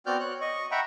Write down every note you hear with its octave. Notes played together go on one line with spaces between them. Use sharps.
B3 C4 F#4 D5 F6 G6
C#5 F#6
D#5 C#6
E5 F#5 G5 A#5 B5 C#6